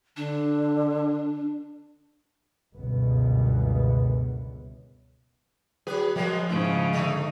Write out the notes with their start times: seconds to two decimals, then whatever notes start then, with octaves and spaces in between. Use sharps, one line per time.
0.17 D3 D4
2.75 G1 C#2 F#2 B2 B3
5.87 F#3 G#4 B4
6.16 F3 F#3 G#3 A#3
6.49 G#2 C#3 C#4 E4
6.93 D3 A3 D#4